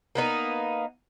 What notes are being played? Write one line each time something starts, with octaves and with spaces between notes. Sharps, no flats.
A#3 B3 D#4